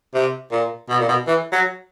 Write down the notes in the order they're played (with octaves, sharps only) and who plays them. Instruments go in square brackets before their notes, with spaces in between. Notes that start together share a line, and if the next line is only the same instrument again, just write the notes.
[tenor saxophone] C3
A#2
B2
A#2
B2
E3
F#3